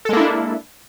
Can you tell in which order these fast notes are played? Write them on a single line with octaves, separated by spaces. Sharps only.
A4 G#3 A#3 E4 D4